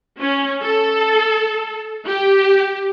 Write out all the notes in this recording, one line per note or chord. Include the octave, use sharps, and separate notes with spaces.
C#4
A4
G4